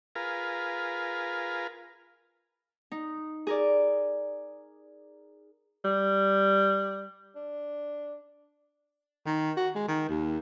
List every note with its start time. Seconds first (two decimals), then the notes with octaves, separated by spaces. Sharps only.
0.15 F4 G#4 A#4 B4 F5
2.91 D#4
3.47 G#4 A#4 D5
5.85 G3
7.36 D4
9.26 D#3
9.56 F#4
9.75 G#3
9.88 D#3
10.09 D#2